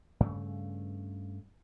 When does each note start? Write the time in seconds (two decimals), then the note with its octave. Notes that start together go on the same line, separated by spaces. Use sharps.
0.20 G2 C#3 A3